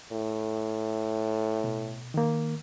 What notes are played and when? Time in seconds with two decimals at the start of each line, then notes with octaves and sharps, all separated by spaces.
0.13 A2
1.64 B2
2.14 D#3 A#3